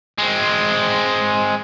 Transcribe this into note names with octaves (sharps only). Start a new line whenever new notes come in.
G#3 C4